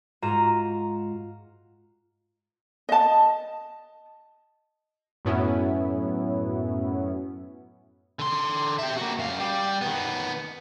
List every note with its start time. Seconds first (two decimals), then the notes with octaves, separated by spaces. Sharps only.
0.22 G#2 F4 F#4 A#5 D#7 E7
2.89 D#5 A5
5.25 F#2 A2 F#3 B3 C#4 E4
8.19 D3 C6
8.78 G4 E5
8.97 A#3 F#4
9.19 F#2 F5
9.39 G3 G4
9.81 D#3 B3